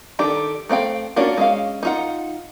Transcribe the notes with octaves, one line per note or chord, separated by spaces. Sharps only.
D#3 D4 G4 A4
A3 C4 F5 G5
A#3 C#4 D4 F4 F#4
G#3 C#4 F5
D#4 F4 F#5